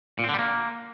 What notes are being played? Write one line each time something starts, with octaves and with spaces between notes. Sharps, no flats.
A#2
C4
D3
G3
A#3